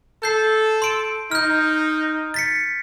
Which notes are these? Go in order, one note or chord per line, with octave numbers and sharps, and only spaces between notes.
A4 G6 C7
C6 D7
D#4 F6 G6
A6 B6 C#7